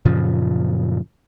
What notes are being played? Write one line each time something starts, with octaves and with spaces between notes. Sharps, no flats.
F#2 A#2 C#3 F3